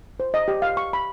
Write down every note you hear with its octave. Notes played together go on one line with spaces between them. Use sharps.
C5
D#5
G4
F5
C#6
B5